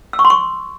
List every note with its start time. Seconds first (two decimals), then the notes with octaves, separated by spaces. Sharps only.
0.13 E6
0.19 C#6
0.25 C6
0.30 C#6